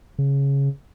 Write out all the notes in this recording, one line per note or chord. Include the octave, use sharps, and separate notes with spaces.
C#3